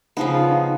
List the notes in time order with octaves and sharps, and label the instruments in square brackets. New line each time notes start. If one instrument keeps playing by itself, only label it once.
[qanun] C#3 F3 B3 [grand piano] D#4
[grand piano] F4
D#4